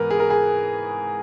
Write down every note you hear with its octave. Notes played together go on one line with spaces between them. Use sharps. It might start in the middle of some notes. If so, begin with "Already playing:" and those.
Already playing: G#2 E3 B3 A#4 B4
G#4
A#4
G#4